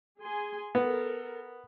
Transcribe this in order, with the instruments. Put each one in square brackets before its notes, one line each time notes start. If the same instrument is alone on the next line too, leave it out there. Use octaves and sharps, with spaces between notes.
[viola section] G#4 G#5 C6
[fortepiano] B3 [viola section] A4 A#4